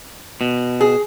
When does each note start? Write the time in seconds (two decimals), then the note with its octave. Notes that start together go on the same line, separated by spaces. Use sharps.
0.41 B2
0.81 G#4